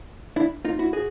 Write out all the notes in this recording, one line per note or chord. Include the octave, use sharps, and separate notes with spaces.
D4 E4
D#4 F4
E4 F#4
F#4 G#4